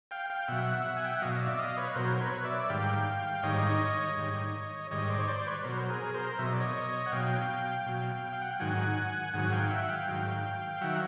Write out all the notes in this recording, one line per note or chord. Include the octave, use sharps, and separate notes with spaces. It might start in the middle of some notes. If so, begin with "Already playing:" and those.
F5 G5
F5 G5
B2 F#3 E5 F#5
G#5
G5
F#5
B2 F#3 D#5 F5
D#5
D5 E5
D#5 F5
B4 C#5
B2 F#3 A#4 C5
B4 C#5
D5 E5
G#2 D#3 G3 F5 G5
G#2 D#3 G3 C#5 D#5
G#2 D#3 G3
G#2 D#3 G3 C#5 D#5
C5 D5
C#5
C5 D5
B4 C#5
B2 F#3 A#4 C5
G#4 A#4
A#4 C5
B2 F#3 E5
D#5
D5
C#5 D#5
F#5
B2 F#3 F5 G5
B2 F#3
F5
F#5
G5
G#2 D#3 F#3 F#5 G#5
G#2 D#3 F#3 F#5 G#5
F5 G5
E5 F#5
F5 G5
G#2 D#3 F#3
D#3 F#3 E5 F#5